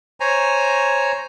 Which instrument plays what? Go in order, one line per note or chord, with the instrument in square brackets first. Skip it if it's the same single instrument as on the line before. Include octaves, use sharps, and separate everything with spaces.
[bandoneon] C5 C#5 G#5 A#5